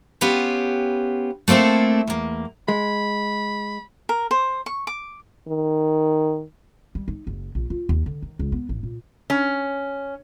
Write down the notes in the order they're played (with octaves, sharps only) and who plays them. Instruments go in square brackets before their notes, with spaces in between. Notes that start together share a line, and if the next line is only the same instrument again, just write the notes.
[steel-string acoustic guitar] B3 C#4 F4 G4 B4
A3 A#3 C4 E4 A4
E2 A#3
[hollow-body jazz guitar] G#3 [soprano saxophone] B5
[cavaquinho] A#4
C5
C#6
D6
[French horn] D#3
[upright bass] G3
D#4
F#1
A#1
F4
D#2
D3
D#3
C#2
B3
A1
A#2
[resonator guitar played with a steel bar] C#4